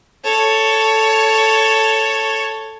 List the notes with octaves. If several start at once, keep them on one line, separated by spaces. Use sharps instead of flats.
A4 C#5